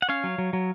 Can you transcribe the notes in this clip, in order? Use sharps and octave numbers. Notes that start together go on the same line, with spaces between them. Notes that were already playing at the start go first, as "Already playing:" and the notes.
F#5
C#4 C#5 F5
F#3
F#3
F#3